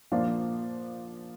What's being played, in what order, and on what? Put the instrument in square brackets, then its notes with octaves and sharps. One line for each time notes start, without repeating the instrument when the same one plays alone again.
[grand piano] A#2 F3 A#3 D4 F4